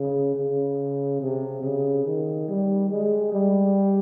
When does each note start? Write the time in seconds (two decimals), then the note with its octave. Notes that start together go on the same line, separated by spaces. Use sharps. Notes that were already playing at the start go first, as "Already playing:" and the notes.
Already playing: C#3
0.35 C#3
1.21 C3
1.63 C#3
2.06 D#3
2.48 G3
2.90 G#3
3.32 G3